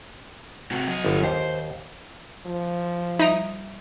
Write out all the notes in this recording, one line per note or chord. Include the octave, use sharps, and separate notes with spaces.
C3 F#4
F#3 D#5
G1
D#2 C5
F3
G3 D#4 E5 A#5 D7